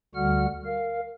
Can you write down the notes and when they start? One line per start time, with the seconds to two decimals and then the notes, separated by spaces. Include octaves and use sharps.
0.15 D2 D3 G3 F#4 F#5 F6
0.65 A#4 F5